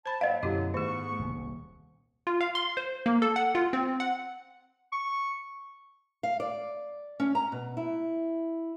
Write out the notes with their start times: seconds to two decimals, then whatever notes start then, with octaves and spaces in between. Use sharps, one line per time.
0.06 C5 A5 B5
0.21 G#2 F#3 A#3 D#5 F5 F#5
0.43 F#2 B2 D3 F#3 E4 F#4 G4
0.74 G#2 D#3 A3 B3 G#4 C#6
1.19 D#1 C2
2.27 F4
2.41 F5
2.55 C6
2.77 C5
3.06 A#3
3.22 A4
3.36 F#5
3.55 F4
3.73 C4
4.00 F#5
4.92 C#6
6.23 F5
6.40 D5
7.20 C#4
7.35 A#5
7.52 B2
7.77 E4